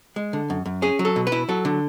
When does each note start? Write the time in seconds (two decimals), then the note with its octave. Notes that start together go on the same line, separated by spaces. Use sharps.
0.16 G#3
0.33 D3
0.50 F#2
0.66 F#2
0.82 C#4 G#4
0.99 F#3
1.05 A4
1.16 B2
1.27 B4
1.32 E4
1.49 F#3 A4
1.65 D3